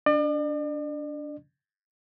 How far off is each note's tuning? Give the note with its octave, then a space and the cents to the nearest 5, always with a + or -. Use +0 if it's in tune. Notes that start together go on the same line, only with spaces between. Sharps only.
D4 -15 D5 +40